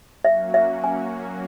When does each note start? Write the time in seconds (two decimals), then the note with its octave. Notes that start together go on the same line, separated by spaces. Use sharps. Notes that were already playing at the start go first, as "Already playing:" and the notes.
0.24 F#3 A#3 C#4 F#4 E5
0.54 E5
0.84 G#5